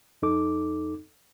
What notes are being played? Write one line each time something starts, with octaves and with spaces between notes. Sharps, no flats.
F2 D#4 A4 D6